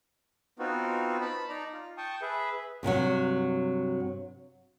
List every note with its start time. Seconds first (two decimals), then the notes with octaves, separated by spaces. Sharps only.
0.59 B3 C4 D#4 F4 F#4
1.21 A5 B5
1.49 D#4 D5 A#5
1.73 F4
1.97 G5 A5 C#6 D#6
2.22 G#4 B4 E5
2.83 G2 C3 E3 F#3